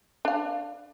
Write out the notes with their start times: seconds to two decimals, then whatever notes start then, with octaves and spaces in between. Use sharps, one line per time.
0.25 D4 F5